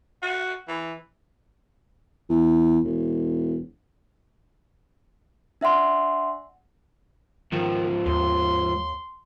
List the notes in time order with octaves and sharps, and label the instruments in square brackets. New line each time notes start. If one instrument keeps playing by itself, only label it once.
[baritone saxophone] F#4
E3
[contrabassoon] E2
E1
[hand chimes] D4 E5 F#5 C6
[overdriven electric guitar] G#2 F3 [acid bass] D#3
[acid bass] D#2 [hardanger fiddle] C6